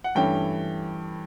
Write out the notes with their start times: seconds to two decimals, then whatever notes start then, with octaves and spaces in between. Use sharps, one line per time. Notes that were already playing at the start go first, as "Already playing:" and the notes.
0.04 F#5
0.15 G2 E3 A3 C#4 G5